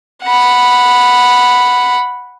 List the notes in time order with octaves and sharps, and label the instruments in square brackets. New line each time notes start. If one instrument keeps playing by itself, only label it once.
[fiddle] F#5 B5